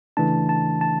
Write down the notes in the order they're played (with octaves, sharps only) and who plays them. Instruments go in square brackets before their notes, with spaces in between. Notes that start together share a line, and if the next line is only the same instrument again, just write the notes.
[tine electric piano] C#3 E3 A3 D4 A5
A5
A5